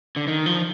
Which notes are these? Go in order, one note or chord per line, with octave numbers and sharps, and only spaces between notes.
D3
D#3
F3